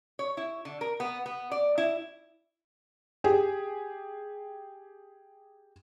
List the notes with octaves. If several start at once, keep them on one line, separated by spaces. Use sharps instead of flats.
C#5
E4
D3
A#4
B3
B3
D5
E4
G4 G#4